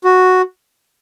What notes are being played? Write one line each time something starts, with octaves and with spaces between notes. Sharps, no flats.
F#4